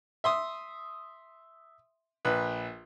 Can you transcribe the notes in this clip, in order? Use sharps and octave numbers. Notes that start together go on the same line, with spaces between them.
E5 C6 D#6
A#1 B4